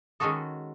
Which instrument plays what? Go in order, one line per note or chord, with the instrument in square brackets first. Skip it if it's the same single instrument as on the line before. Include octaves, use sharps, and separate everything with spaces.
[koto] D#3 G#3 C#4 F#4 A4 [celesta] C#6 D#6